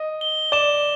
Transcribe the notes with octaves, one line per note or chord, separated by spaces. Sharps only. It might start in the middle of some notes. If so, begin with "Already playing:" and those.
Already playing: D#5
G7
D5 E7